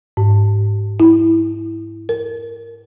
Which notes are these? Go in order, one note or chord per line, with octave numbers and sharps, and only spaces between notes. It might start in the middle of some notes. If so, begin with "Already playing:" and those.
G#2
E4
A#4